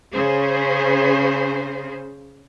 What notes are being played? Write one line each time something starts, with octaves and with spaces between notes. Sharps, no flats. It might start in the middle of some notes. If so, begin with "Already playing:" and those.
C#3 C#4 G#4 C5